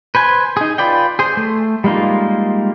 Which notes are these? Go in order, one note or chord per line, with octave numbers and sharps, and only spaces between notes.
B4 C5 G#5
D#4 G#4
F4 B4 D5 G5
G#4 C5
A3
G3 G#3 A#3 D#4 F4